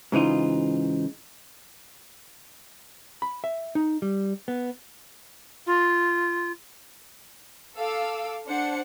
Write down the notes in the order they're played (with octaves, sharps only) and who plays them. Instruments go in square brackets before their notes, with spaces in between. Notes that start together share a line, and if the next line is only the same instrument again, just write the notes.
[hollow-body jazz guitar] G#2 C#3 E3 D#4 F4
B5
E5
D#4
G3
B3
[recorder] F4
[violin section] A4 F5 D6 E6
D4 C5 F#5 C#7